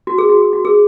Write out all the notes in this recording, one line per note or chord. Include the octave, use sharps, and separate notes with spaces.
F#4
G#4
F#4
G#4
F#4
G#4